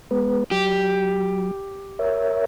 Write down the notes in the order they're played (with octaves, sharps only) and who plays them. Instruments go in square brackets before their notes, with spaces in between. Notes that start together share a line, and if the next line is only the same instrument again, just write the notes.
[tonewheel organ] G#3 B3 B4
[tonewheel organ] F#3 [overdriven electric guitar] G4
[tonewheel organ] A#4 C#5 E5